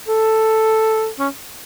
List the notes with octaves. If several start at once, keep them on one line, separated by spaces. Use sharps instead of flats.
A4
C#4